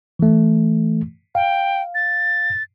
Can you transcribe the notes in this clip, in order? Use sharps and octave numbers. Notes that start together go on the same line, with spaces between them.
E3 A3
F5 G5
A6